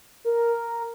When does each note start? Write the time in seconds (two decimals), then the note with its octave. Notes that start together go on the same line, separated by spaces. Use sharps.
0.25 A#4